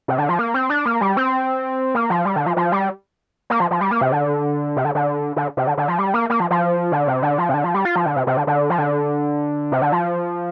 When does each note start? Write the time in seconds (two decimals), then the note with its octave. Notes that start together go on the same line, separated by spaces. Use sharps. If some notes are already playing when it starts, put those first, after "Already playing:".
0.08 C3
0.18 D3
0.29 F3
0.39 A#3
0.54 C4
0.70 D4
0.86 A#3
1.01 G3
1.17 C4
1.94 A#3
2.10 F3
2.25 G3
2.36 D3
2.46 F3
2.57 F3
2.72 G3
3.50 A#3
3.60 F3
3.71 F3
3.81 G3
3.91 A#3
4.01 C3
4.12 D3
4.76 C3
4.85 D3
4.95 D3
5.36 D3
5.57 C3
5.67 D3
5.77 D3
5.88 F3
5.99 G3
6.14 A#3
6.30 A#3
6.40 F3
6.50 F3
6.92 D3
7.07 C3
7.23 D3
7.38 F3
7.49 C3
7.54 D3
7.64 F3
7.74 G3
7.85 F4
7.96 F3
8.06 D3
8.16 C3
8.27 C3
8.37 D3
8.47 D3
8.70 F3
8.78 D3
9.72 C3
9.82 D3
9.92 F3